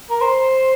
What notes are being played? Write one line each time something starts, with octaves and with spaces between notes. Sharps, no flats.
A#4
C5